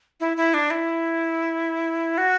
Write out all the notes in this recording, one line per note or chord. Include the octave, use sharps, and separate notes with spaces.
E4
E4
D4
E4
F#4